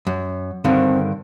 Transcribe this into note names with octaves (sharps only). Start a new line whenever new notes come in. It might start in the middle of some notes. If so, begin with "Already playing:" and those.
F#2
G2 D3 D#3 C4